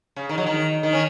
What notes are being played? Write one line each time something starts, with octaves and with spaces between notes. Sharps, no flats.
C#3
D#3
F#3
D#3
D#3
C#4